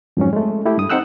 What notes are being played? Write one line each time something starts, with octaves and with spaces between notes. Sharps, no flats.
F2 G#2 F#3 C#4
G#3 A3
A3 E4 G4
G2 D#6
C4 D#4 F#5 G5 E6 F#6